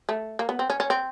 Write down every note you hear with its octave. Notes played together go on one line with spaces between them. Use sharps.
A3
A#3
B3
C4
C#4
C#4
C4